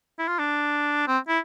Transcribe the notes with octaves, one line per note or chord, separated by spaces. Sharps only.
E4
F4
D4
C4
E4